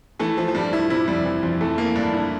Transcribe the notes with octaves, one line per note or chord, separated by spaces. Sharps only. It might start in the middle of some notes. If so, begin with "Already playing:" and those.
E3 A3
E3 F3
F3
G2 G3
G2 E4
C3 E4
F2 G3
E3
F2 F3
E3 A3
E3 A#3
G2 D4
G2 E4